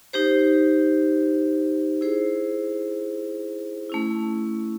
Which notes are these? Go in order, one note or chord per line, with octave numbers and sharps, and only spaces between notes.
D#4 G4 C5
E4 G#4 C5
A3 C#4 E4